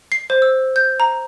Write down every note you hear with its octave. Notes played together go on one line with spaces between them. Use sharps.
C7
C5
E6
G6
A#5